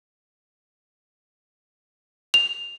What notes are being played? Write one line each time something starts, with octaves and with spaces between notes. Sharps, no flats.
F7